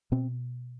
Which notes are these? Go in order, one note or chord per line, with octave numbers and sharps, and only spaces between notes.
B2 C4